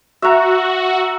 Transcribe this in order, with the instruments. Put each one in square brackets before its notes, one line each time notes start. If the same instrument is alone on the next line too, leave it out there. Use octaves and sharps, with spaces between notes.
[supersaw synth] F#4 [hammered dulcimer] E5 A#5